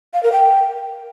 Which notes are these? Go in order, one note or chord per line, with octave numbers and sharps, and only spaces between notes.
F5
A#4
G5